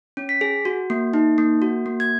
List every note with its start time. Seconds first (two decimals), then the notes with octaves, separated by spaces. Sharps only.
0.17 C#4
0.29 B6
0.41 G#4
0.65 F#4
0.90 A#3
1.14 D#4
1.38 A#3
1.62 F#4
1.86 A#3
2.00 G#6